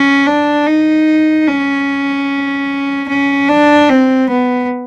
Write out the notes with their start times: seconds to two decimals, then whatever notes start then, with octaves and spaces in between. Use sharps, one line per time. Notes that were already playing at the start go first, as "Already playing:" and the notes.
Already playing: C#4
0.26 D4
0.66 D#4
1.48 C#4
3.08 C#4
3.49 D4
3.89 C4
4.29 B3